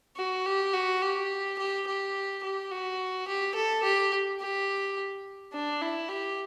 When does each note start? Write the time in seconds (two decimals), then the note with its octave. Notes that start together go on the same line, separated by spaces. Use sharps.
0.17 F#4
0.46 G4
0.73 F#4
1.02 G4
1.59 G4
1.87 G4
2.43 G4
2.71 F#4
3.28 G4
3.55 A4
3.83 G4
4.40 G4
5.53 D4
5.81 E4
6.08 G4